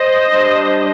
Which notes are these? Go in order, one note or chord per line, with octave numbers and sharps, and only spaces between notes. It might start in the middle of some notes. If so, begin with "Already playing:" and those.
Already playing: C5 D#5
G3 D4